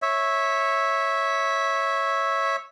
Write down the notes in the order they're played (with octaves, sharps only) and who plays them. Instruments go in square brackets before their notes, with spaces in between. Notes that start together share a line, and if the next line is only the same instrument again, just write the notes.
[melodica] C#5 E5